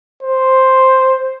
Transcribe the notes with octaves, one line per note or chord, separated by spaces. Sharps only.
C5